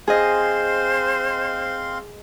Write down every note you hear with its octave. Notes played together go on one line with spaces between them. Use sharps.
C4 G#4 C5 D#5 F5 C6